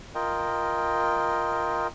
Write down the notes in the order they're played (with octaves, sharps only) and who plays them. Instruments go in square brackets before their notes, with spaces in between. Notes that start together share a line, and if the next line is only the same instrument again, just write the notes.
[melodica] F4 A#4 D#5 G5